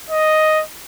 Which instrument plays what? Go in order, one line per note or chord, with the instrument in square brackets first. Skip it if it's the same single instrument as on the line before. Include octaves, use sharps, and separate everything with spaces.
[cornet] D#5